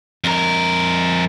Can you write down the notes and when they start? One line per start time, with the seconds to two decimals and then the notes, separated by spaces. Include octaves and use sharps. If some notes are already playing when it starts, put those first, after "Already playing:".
0.24 F2 A#4